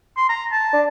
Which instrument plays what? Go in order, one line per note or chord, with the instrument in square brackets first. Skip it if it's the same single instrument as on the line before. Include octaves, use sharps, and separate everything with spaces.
[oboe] C6
A#5
A5
[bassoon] D4